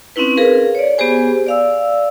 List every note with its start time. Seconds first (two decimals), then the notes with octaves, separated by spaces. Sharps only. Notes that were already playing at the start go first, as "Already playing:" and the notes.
0.16 C4 C#4 D#4 E4 B4
0.37 G#4 A#4 B4 F5
0.75 C#5 D5
0.98 B3 G4 G#4 C5 G#5
1.46 D5 F5 E6